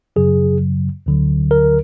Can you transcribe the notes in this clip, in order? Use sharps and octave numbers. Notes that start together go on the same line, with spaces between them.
F#2 C#3 F#3 G#4
D2 D3 F#3
A#4